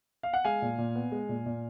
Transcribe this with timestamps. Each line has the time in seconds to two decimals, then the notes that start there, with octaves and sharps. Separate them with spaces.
0.23 F5
0.33 F#5
0.45 G#3 F5 G#5
0.62 A#2
0.78 A#2
0.95 B3
1.12 G#3
1.29 A#2
1.46 A#2